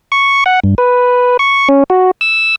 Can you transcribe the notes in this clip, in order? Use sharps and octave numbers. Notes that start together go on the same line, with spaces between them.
C#6
F#5
G2
B4
C#6
C#4
F#4
E6